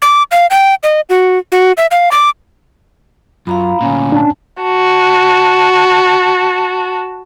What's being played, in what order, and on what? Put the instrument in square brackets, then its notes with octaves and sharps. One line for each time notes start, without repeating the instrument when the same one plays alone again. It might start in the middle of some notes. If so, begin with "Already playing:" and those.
[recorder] D6
F5
G5
D#5
F#4
F#4
E5
F5
D6
[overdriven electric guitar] F#2 [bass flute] F4 [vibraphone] F5 A#5 B5
[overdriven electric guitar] D2 A#2 [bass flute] C#4
[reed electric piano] D4 A5
[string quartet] F#4 A5